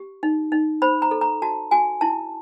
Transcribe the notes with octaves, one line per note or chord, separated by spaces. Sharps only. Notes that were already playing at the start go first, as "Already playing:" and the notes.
Already playing: G4
D#4
D#4
C5 B5
A#5
A4
A#5
F#4 A5
F#4 G#5
E4 A5